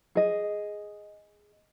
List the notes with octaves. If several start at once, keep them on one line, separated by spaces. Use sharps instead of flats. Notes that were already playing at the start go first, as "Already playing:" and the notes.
G#4 D#5